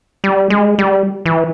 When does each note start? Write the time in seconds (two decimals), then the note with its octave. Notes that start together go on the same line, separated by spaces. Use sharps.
0.24 G3
0.50 G#3
0.79 G3
1.26 E3